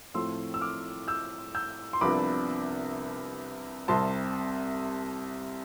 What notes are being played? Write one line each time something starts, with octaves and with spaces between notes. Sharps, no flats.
A2 F3 A3 C4 C6 E6
E6
D6 F6
E6 G6
E6 G6
C6
C2 C3 F3 B3 D4 B5 D6
C2 C3 G3 C4 A5 C6